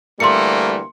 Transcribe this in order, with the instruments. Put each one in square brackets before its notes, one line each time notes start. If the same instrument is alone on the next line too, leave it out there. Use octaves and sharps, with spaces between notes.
[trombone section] D2 E3 G3 [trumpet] A3 [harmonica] A#3 [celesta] C6 C#7